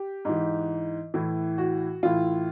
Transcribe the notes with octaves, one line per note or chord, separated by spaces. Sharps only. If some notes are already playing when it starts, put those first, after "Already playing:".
Already playing: G4
G#2 E3
A2 E3
F#4
A2 E3 F4